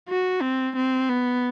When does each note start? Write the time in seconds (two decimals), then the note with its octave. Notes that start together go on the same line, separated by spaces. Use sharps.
0.09 F#4
0.42 C4
0.76 C4
1.10 B3